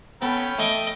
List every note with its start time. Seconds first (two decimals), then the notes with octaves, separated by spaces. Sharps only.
0.22 B3 C#4 A4 G5 B5
0.59 A3 D#5 C#6 D6